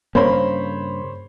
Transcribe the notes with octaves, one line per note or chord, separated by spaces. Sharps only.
G2 C#3 A#3 C5 C#5 B5